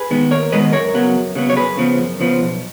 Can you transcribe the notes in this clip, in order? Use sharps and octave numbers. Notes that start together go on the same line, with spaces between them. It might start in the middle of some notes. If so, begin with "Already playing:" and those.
Already playing: G#4 B4
D#3 G#3 B3
D#2 A#4 C#5
D#3 G#3 B3 B4 D#5
F#2 A#4 C#5
C#3 F#3 B3
F#2
C#3 F#3 B3
C#5
F#2 G#4 B4
C#3 F3 B3
F#2
C#3 F3 B3
B1